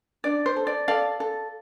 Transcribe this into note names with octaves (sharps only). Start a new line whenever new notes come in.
D4 D5
C5
A4
D5
A4 D5 F5
A4